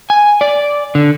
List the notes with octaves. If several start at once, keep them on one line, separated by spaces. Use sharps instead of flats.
G#5
D5
D3